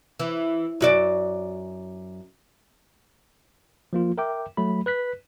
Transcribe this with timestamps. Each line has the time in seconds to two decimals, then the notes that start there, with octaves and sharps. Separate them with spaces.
0.19 E3
0.81 F#2 F#4 D5
3.93 F3 A#3 F4
4.18 A#4 E5 G5 D6
4.57 F#3 A3 B5
4.86 B4 F#6 B6